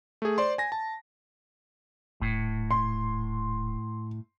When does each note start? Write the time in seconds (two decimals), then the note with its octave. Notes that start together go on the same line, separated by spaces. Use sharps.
0.22 A3 G#4
0.38 C5 D5 C6
0.58 G#5 A#6
0.72 A5
2.21 D#1 A2
2.71 C6